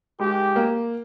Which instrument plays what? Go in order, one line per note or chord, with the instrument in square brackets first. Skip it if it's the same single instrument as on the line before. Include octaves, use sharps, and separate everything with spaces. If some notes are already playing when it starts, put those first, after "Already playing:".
[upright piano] G#3 [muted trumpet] G4
[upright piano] A#3